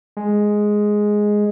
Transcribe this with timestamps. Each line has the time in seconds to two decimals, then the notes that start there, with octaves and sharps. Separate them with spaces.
0.17 G#3